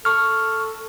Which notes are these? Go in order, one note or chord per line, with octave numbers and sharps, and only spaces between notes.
A4 C#6 F6